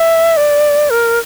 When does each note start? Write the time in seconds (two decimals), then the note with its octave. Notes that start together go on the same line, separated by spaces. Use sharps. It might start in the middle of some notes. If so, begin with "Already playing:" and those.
Already playing: E5
0.37 D5
0.90 A#4